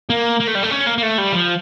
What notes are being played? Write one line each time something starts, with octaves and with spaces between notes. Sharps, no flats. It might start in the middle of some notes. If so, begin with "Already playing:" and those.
A#3
A#3
A3
G3
A3
C#4
A#3
A#3
A3
G3
F3